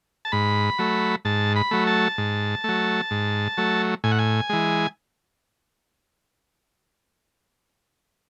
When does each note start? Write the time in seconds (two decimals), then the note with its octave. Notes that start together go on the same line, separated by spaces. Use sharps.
0.25 A5
0.32 G#2 B5
0.79 F#3 A3
1.25 G#2 A5
1.56 B5
1.71 F#3 A3
1.87 A5
2.18 G#2
2.64 F#3 A3
3.11 G#2
3.57 F#3 A3
4.04 A2 G#5
4.11 F#5
4.19 G#5
4.49 E3 G#3